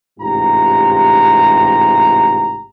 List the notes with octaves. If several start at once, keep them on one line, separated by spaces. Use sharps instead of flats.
A1 G#2 C3 F4 G4 A#5